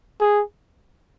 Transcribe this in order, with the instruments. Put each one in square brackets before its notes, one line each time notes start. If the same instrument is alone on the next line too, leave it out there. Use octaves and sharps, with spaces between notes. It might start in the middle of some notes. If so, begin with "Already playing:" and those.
[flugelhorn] G#4